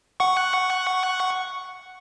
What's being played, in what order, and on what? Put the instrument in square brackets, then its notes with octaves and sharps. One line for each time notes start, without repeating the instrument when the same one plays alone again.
[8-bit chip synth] F#5 C#6